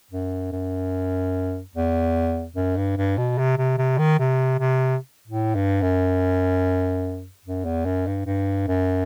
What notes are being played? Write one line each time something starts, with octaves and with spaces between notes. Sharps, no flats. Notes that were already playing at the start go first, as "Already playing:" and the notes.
F#2
F#2
E2
F#2
G2
G2
B2
C3
C3
C3
D#3
C3
C3
A2
G2
F#2
F#2
E2
F#2
G2
G2
F#2